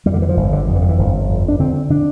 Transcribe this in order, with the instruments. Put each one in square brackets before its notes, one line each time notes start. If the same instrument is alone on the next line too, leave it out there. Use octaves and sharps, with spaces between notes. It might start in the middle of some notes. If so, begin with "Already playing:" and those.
[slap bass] F2 G3
D3
E3
F3
G1
D3
F2
E3
D3
E3
G1 F3
F2
D4
D3 C4
D3 D4